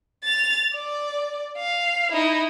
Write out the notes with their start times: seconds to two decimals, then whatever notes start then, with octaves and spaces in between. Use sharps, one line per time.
0.24 A6 F7
0.74 D5
1.57 F5
2.12 D#4 E4